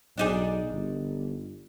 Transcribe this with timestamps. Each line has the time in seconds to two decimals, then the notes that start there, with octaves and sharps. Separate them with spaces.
0.18 B1 D4 D#4 G#4
0.72 G1